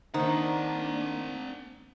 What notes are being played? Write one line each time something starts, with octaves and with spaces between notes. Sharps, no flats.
D#3 A#3 C4 D4 C5 F#5 A#5